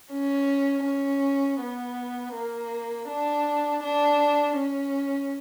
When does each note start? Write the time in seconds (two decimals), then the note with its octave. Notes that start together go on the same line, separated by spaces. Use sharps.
0.11 C#4
0.86 C#4
1.60 B3
2.35 A#3
3.09 D4
3.83 D4
4.58 C#4